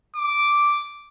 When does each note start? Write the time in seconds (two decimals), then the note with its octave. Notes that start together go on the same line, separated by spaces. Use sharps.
0.16 D6